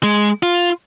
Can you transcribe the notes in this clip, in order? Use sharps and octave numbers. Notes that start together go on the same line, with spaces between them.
G#3
F4